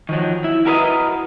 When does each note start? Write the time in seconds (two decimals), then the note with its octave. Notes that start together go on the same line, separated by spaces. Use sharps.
0.09 D#3 F3 F#3
0.44 E4
0.65 E4 F#4 A#4 B4 D5 D#5